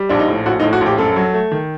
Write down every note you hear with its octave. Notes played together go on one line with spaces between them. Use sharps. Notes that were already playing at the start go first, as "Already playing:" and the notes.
Already playing: G3
A#1 D4
D#4
A2
A#1 F#4
D#4
A2
F#4
A#1 G4
F#2 A4
F#3
A3
D#3